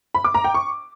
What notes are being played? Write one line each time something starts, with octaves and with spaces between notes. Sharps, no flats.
B5
D6
A#5
G5
C#6